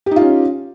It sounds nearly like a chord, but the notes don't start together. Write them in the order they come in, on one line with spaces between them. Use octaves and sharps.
G4 D#4 F4 C#4